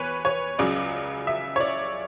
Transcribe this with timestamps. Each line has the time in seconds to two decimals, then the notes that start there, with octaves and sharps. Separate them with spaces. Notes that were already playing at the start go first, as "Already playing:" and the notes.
Already playing: E2 B4 C#5
0.25 C#5
0.59 C#2 C#3 F#3 D5
1.27 E5
1.56 C#5
1.60 D5